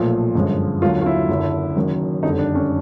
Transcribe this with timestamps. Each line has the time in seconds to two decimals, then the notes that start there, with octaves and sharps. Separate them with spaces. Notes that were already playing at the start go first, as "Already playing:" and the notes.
Already playing: B1 A#2 F3 A3 F4
0.35 G1 F#2 D3 F3 G#3
0.82 D#2 D3 F#3 F4
1.01 F4
1.06 E4
1.29 F#1 F#2 D3
1.76 F#1 F#2 D#3 F#3
2.23 F#1 F2 D3 G3 D#4
2.38 D4
2.55 C#4